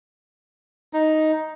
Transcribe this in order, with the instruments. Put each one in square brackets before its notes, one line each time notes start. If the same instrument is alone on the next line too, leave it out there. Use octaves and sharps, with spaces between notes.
[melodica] D#4